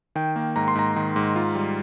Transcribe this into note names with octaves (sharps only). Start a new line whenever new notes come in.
D#3 G5
A#3
G#2 A#5
C6
G#2 A#5
D#3
G#2
F4
G3